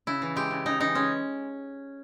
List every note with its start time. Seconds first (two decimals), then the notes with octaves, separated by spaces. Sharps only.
0.07 C#3 E4
0.22 E3
0.36 G#3 G4
0.51 C#3
0.66 C#3 D#4
0.80 E3 D#4
0.95 G#3 C#4